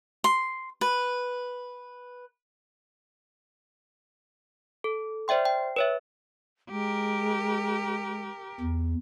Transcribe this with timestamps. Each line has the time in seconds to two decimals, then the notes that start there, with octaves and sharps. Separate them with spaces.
0.24 C6
0.81 B4
4.84 A4
5.28 C5 D5 E5 G5 C6
5.45 G5
5.76 B4 C#5 E5
6.71 G#3 G4 A#4
8.60 E2